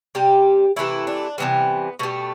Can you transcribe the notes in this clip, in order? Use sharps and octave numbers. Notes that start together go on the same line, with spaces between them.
C3 G3 G4
C3 E3 A3 E4
D4
C3 E3 G3 B3
B2 G3 A3